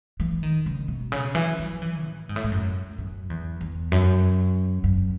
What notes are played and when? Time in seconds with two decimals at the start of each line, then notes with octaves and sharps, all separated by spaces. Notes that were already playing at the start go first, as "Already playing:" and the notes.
0.20 E3
0.43 D#3
0.66 C#3
0.88 B2
1.12 C#3
1.35 E3
1.59 F#3
1.82 E3
2.06 A2
2.29 G#2
2.36 A2
2.44 G#2
2.52 F#2
2.98 F#2
3.30 E2
3.61 E2
3.92 F#2
4.84 F#2